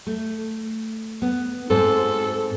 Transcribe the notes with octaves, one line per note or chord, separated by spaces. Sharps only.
A3
B3
G#2 C4 A4